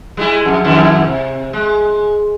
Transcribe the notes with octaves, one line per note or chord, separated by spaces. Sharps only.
G3 G#3 E4
F2
F2 D#3 E4
C3
G#3